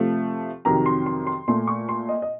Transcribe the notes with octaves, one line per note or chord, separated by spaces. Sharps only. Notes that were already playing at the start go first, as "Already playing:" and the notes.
Already playing: C3 F3 A3
F2 C3 D#3 F#3 A#5
C6
C6
C6
A#2 A3 C6
C#6
C6
D#5
D#5